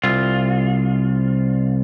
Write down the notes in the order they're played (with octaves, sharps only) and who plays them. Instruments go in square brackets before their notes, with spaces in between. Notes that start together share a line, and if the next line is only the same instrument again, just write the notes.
[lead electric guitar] C2 F4